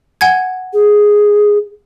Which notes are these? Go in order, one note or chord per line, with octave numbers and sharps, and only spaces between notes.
F#5 G#5 G#6
G#4